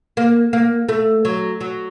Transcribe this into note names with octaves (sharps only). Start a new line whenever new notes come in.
A#3
A#3
A3
F#3
F#3